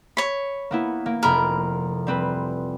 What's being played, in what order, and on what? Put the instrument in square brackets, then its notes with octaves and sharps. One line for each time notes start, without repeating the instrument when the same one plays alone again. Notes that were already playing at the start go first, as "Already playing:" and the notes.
[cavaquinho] C#5 B5
[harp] A#3 B3 E4
A#3
[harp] F1 B5 F6 [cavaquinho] A#4
[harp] G3 C4 B4